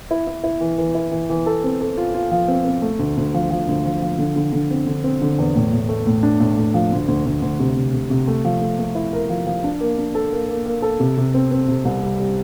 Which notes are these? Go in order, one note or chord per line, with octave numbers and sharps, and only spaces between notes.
E4
E4
E4
E3
E3
E4
E3
E3
A4
C4
A4
F4
F4
F3
C4
C4
A3
D2
D2
F3
F3
D2
F3
F3
D3
D3
D3
C4
D3
C4
D3
E2
A2
A2
A3
A2
D4
A2
A2
F3
D2
D2
D2
D2
C3
C3
C3
C3
A3
F3
A3
A3
E4
A#4
F3
F3
D4
A#3
D4
A4
A#3
A#3
A#3
A4
C3
C3
C4
C4
C3
C2
G3
G3